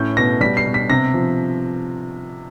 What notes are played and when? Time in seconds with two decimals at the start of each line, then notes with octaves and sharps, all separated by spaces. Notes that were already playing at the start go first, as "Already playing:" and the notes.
Already playing: A2 C#4 G6
0.17 B2 A#6
0.41 G3 B6
0.57 C7
0.66 B2
0.74 B6
0.90 C3 A#6
1.14 F3